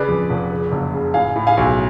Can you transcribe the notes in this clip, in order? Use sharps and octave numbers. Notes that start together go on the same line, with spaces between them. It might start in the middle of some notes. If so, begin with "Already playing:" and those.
Already playing: C#3 B4 D5
F2
F1
C#3
F#1
C#3
A2 F5 G#5
A2
F5 G#5
B1